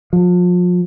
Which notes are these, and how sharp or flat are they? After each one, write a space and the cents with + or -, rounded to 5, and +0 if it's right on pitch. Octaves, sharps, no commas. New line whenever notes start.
F3 +35